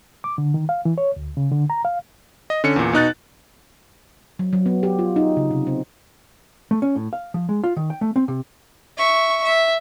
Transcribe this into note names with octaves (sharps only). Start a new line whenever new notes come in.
D6
D3
D#3
F5
E3
C#5
D2
C#3
D3
A#5
F5
D#5
D3 C#4 C#7
E2 A#2
B2 D#4 F#6 A6
F#3
F#3
B3
G4
F4
D#4
C#3
C3
C4
A3
C#4
A2
F5
F3
G#3
F4
D#3
G5
A3
C4
C3
E5 C#6
E5